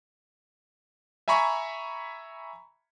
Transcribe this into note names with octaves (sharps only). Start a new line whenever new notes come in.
E5 G#5 A#5 B5 C#6